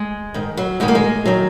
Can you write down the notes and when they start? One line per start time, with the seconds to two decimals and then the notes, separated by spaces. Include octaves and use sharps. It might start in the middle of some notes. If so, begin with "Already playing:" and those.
Already playing: G#3
0.34 G#2 D#3
0.57 F#3
0.80 G#2 D#3 G#3
0.88 A#3
0.95 G#3
1.26 D#3 F#3